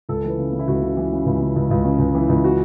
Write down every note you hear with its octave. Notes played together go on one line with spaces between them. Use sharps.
C#2 A4
E3 B4
C#3
C#3
E4
C#2 F#4
C#3
E3
C#3
C#2
C#3
C#2
C#2
C#3
C#2
E3
C#2
F#4